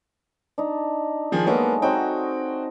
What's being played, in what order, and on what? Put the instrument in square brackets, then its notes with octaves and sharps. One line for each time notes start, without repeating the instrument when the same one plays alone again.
[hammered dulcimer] D4 D#4
[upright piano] D#3 F3 G#4
[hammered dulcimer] F#3 G#3 A4 [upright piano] A#3 B3
[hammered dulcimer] F#3 C4 D#4 [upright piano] F#4 G5